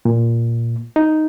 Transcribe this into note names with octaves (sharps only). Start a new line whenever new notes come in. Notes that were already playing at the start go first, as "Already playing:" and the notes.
A#2
D#4